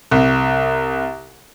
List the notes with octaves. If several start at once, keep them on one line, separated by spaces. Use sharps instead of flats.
C2